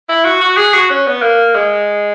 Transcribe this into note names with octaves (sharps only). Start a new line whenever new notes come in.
E4
F#4
F#4
G#4
F#4
C#4
B3
A#3
G#3